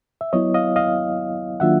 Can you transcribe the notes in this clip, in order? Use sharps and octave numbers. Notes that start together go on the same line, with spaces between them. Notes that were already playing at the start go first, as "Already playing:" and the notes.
E5
F#3 B3 E4 C#5 D#5
D#5 F5
D#5 F5
D#3 F#3 A#3 D4 F4 E5 F#5